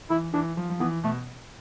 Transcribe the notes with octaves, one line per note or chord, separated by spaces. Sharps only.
E3 E4
E3 D4
F3
F3
E3 B3
B2 A3